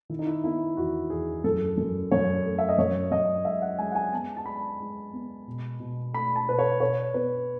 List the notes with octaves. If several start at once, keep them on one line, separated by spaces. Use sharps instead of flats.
D#3 E4
D#4
E4
B3 E4
E2 F#4
E2 G#4
F#2 A4
F#2
F#2 C#5
A3
E5
D#5
F#2 C#5
F#2 D#5
G#3 E5
F#5
G#3 G#5
F#5
G#5
B3 A5
A5
G#3 B5
G#3
B3
B2
B2
A3 B5
A5
B2 B4
C#5
B2 C#5
B3 B4